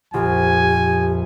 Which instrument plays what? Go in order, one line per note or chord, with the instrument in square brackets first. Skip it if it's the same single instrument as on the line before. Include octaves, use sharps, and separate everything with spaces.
[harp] A#1 [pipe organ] F2 F3 [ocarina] G4 [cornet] G#5